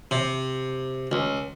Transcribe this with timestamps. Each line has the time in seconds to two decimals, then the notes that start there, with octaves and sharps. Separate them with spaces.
0.11 C3
1.12 C#2